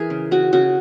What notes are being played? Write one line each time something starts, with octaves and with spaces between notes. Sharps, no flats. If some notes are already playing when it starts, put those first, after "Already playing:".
Already playing: E3 G#4 A#4
C#3
C#3 F#4
C#3 F#4